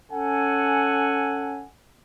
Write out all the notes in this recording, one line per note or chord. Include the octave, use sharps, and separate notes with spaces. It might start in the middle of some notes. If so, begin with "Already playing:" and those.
C#4 A4 F#5 G#5